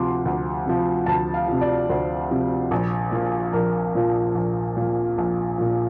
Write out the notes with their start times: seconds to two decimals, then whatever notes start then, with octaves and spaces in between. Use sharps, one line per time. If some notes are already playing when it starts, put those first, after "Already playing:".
Already playing: D2 C3 F3 C6 D6
0.25 D2
0.66 C3 F3
1.06 D2 A5
1.34 F5
1.48 C3 F3
1.61 D5
1.89 D2 C5
2.31 C3 F3
2.71 A#1
3.12 A#2 F3
3.53 A#1 A#4
3.95 A#2 F3
4.35 A#1
4.77 A#2 F3
5.18 A#1
5.58 A#2 F3